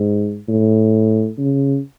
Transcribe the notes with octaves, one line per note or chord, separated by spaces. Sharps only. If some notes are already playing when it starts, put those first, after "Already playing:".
Already playing: G#2
A2
C#3